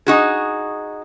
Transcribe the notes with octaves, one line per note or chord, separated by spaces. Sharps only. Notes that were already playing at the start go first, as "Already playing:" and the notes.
D#4 F#4 G#4